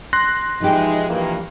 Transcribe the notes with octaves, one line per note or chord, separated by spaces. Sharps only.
C6 F#6 A#6
E3 F3 G#3 D#4 G4
G2 E3 A#3